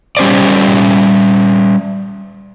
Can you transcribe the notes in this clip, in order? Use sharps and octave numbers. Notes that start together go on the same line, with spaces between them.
G3 C#4 C5 D5